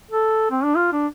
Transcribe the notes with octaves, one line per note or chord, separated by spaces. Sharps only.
A4
C4
D4
F4
D4